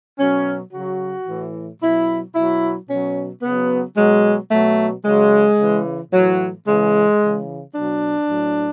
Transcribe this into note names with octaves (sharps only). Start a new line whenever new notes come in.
B2 F#3 C#4
C#3 F#3 F#4
A2 E3
B2 F#3 E4
B2 F#3 E4
B2 F#3 C#4
C#3 F#3 B3
B2 F#3 G#3
B2 F#3 A3
C#3 F#3 G#3
C#3 E3
A2 E3 F#3
C#3 E3 G#3
C#3 E3
B2 F#3 D4
A2 F#3